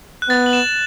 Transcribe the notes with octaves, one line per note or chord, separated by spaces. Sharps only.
F#6
B3 A6
F#7
E7